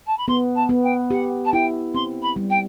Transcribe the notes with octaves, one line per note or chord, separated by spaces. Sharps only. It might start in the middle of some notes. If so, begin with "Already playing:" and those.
A5
B5
B3 C6
A5
B3
G5
G4 F#5
A5
E4 G5
C4 C6
B5
G3
G5